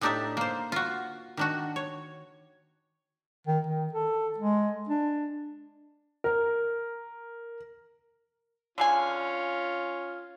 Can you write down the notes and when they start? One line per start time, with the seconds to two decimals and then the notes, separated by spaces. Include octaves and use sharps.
0.01 A2 D4 D#4 G4 D5 E5
0.37 A#3 C5
0.72 F4 F#4
1.37 D#3 D4 F#4
1.76 C#5
3.47 D#3
3.67 D#3
3.93 A4
4.38 G#3
4.89 D4
6.24 A#4
8.78 D3 C#4 F4 G#4 G#5